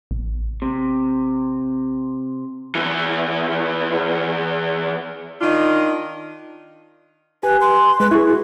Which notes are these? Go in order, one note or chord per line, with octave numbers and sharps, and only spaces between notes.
A1
C3
E2 E3
D#3 D4 F4 D#5
G4 B4 G#5
C6
G#3 B4
E4 G#4 C#6
F#4